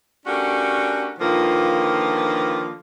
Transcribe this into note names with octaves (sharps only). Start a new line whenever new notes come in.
A3 C#4 D4 F#4 G4 A#4
D3 D#3 F3 A#3 F4 B4